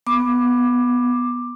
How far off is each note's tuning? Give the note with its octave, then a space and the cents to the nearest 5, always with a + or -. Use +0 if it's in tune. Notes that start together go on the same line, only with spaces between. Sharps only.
B3 +0 D6 +10